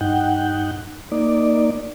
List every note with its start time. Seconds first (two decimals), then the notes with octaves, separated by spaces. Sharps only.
0.01 G2 D#4 F#5 G5
1.12 A#3 D#4 D5